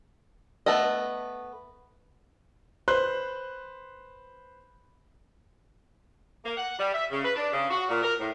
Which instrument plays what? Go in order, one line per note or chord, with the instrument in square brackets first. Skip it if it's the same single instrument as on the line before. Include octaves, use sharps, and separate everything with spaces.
[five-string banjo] A3 B3 A4 D#5
[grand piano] B4 C5 C6 F#6
[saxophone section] A#3
F#5
G3
E5
C#3
B4
D4
C#3
F#4
A#2
A#4
A2